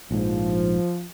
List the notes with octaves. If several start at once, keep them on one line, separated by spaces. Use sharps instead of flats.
A#1 G#2 F3